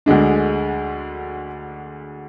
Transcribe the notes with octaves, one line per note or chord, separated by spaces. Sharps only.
D2 D3 G#3 D4